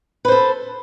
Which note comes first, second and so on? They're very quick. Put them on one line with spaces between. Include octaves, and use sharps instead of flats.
B4 C5 A4